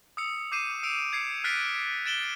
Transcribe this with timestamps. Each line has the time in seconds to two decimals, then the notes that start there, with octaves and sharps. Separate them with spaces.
0.17 D#6 E6 C#7
0.52 D6 G6 C7 D#7 E7
0.83 E6 D7 F7
1.13 G#6 C7 C#7
1.44 F6 F#6 A6 B6 C7 D7
2.06 A6 D7 E7 F#7 G7